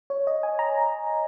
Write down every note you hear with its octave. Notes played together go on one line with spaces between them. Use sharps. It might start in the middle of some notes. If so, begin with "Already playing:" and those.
C#5
D#5
G#5
A#5